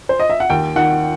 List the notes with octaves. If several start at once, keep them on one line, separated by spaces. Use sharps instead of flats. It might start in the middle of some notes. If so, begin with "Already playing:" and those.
C5
D#5
E5
F#5
D#2 G5
D#3 F#5